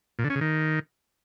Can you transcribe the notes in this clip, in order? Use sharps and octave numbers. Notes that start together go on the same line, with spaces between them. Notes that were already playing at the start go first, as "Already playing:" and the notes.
A#2
D3
C#4
C#3
D#3